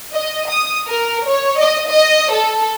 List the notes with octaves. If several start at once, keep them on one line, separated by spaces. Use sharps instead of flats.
D#5
D#6
A#4
C#5
D#5
D#5
A4